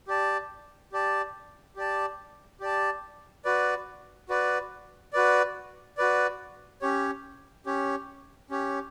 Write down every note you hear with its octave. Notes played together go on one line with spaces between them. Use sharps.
G4 D5 A5
G4 D5 A5
G4 D5 A5
G4 D5 A5
F#4 B4 D5
F#4 B4 D5
F#4 B4 D5
F#4 B4 D5
C#4 G4 C#5
C#4 G4 C#5
C#4 G4 C#5